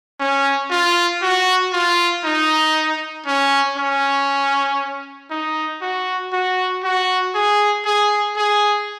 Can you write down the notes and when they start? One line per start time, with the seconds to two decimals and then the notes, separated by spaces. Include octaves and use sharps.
0.20 C#4
0.71 F4
1.22 F#4
1.73 F4
2.24 D#4
3.27 C#4
3.78 C#4
5.31 D#4
5.82 F#4
6.33 F#4
6.84 F#4
7.35 G#4
7.86 G#4
8.37 G#4